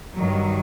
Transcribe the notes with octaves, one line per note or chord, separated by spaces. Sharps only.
G2 D#3 F#3